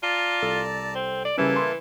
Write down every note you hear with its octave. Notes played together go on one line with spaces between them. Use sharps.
F4 D5 A5 A#5
C2 A4 E6
C4
D5
C#3 E3 G3 A#3 C#4 E4 A4
C6